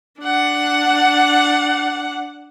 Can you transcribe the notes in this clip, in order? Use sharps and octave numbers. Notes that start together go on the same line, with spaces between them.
D4 F#5